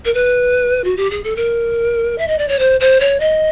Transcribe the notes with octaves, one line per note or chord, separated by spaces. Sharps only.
A#4
B4
F#4
G4
G#4
A4
A#4
E5
D#5
D5
C#5
C5
C5
C#5
D#5